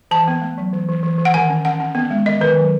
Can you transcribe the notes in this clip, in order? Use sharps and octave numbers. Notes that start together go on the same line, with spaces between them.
E3 A5
B3
A3
F#3
E3
E3
E3
E3
F#5
D#3 G#5
C#4
C#4 F#5
C#4
B3
G#3
D#3 D#5
D#3 B4
F#3